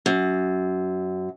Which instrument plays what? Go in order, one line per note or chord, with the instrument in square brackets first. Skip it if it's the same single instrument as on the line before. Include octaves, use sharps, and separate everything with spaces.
[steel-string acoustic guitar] F#2